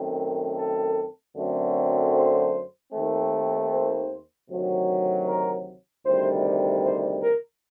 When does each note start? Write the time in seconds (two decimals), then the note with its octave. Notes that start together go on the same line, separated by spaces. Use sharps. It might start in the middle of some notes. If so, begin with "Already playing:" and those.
Already playing: F#2 D#3 A3 C4
0.57 A4
1.36 F#2 D3 F#3 A3 C4
2.13 C5
2.92 D#2 D#3 A3 C4
3.70 C5
4.49 D2 C3 D#3 F#3
5.27 A#4
6.05 D2 C3 D#3 G3 C5
6.83 C5
7.23 A#4